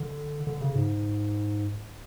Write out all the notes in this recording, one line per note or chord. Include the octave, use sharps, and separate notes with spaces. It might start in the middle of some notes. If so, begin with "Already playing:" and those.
Already playing: D3
D3
C#3
G#2